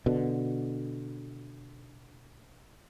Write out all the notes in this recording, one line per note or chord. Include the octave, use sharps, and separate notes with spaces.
B2 D3